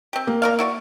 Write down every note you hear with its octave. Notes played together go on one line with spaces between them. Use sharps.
C4 G4
A#3
A#4 D5 F5
E4 F#4 D5